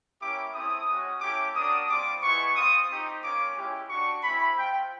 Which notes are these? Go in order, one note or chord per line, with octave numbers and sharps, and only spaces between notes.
A#3 C#4 E4 G4 D6
A3 C4 E4 D#6
G#3 C#4 F#4
A3 C#4 E4 G4 D6
A#3 D4 F#4 D#6
G3 C4 F4 D6
G#3 B3 E4 C#6
C4 F4 D#6
C4 D#4 G4
A#3 C#4 F4 D6
G#3 C#4 E4 G4
A3 D4 F#4 C#6
G#3 C4 E4 B5
C4 F4 G5